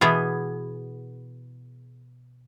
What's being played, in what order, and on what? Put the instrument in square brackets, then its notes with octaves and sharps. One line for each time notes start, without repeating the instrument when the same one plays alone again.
[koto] B2 E3 B3 G#4